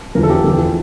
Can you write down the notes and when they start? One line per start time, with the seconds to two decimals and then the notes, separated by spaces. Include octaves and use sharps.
0.15 E2 D3 F3 A#4
0.23 A4
0.30 G4
0.44 E2 D3 F3
0.58 A4